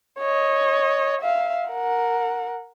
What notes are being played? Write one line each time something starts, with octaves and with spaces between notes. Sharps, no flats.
C#5 D#5
E5 F5
A#4 F#5